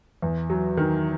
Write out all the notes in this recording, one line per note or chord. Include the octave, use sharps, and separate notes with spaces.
E2
F#3
D#3